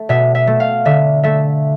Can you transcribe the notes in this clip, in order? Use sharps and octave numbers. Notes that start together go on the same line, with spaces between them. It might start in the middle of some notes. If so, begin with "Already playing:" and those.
Already playing: A3
B2 E5
E5
A3
F5
D3 E5
A3 E5